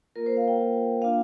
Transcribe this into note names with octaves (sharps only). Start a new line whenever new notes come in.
A#3 F4 A#4
C5
F5
G5
A#3 F4
A#3 D4 F4 F5